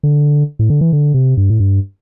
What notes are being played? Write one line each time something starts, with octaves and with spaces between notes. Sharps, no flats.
D3
A2
D3
E3
D3
C3
G2
A2
G2